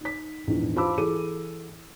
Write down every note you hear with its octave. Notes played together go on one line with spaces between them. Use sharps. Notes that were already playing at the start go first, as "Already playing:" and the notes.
D#4 B6
A#1 E2 G#2
F4 C5 A5 B5 D6 E6
E3 G#4 A4 D6 D#7